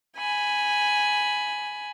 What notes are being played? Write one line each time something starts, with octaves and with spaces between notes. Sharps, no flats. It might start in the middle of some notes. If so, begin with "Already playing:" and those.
G#5 B5